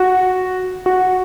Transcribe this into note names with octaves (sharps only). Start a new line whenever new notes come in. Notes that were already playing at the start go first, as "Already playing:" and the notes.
Already playing: F#4
F#4